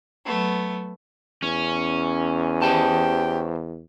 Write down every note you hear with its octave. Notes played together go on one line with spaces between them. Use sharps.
F#3 A3 B3
E2 C#4
G4 C5 G5 A5